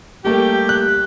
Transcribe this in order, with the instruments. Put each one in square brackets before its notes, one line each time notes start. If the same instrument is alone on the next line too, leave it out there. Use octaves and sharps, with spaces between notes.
[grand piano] G3 A3 A#3 [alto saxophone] G4
[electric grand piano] F#6